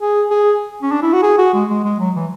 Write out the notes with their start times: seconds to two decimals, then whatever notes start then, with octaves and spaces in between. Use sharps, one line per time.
0.01 G#4
0.31 G#4
0.82 C#4
0.92 D4
1.03 E4
1.13 F#4
1.23 G#4
1.38 F#4
1.54 G#3
1.70 G#3
1.84 G#3
1.99 F#3
2.16 E3